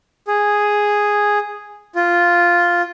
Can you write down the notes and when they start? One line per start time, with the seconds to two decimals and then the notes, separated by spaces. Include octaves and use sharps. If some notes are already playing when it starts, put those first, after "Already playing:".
0.28 G#4
1.96 F4